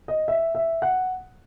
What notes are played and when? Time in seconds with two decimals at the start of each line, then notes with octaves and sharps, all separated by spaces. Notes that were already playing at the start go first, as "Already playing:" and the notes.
0.08 D#5
0.28 E5
0.55 E5
0.82 F#5